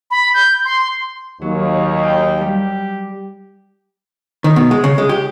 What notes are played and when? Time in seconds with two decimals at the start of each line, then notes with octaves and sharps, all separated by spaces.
0.11 B5
0.34 G6
0.65 C6
1.42 D#2 F#3 C#5
2.04 G5 G#5
2.41 G3 G4
4.44 D#3
4.56 B2
4.71 G#3
4.84 C#3
4.98 G#3
5.09 G4